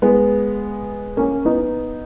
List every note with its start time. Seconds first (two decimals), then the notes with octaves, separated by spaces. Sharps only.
0.02 G#3 B3
1.17 A#3 C#4
1.45 B3 D#4